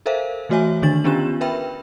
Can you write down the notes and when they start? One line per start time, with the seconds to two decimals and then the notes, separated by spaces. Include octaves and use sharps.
0.06 A4 A#4 C5 E5 F5
0.49 E3 A3 F#4 C#5 E5 G#5
0.82 D3 D#3 D4 A6 F#7
1.04 B3 C#4 D4 F4 G4 E7
1.41 A#4 B4 E5 G5 B5